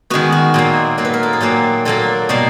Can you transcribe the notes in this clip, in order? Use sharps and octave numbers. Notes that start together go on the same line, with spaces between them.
D#3 G#3 B3 F#4
F#4
A#2 F#3 A#3
A#2 F#3 A#3
B4
A#4
A4
G#4
A#2 F#3 A#3 G4
A#2 F#3 A#3 A4
B2 G3 A#3